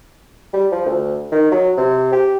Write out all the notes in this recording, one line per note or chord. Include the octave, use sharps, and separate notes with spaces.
G3
F3
D2
D#3
F#3
C3
G4